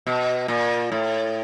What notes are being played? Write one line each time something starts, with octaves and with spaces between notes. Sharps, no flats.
B2
A#2
A2